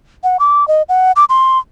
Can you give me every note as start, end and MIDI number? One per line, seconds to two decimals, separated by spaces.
0.24 0.37 78
0.40 0.67 86
0.68 0.82 75
0.89 1.12 78
1.16 1.25 86
1.29 1.59 84